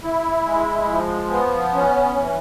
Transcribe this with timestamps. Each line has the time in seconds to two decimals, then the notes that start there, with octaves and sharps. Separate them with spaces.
0.04 E4
0.46 G#3
0.88 F3
1.30 B3
1.74 C#4
2.16 E3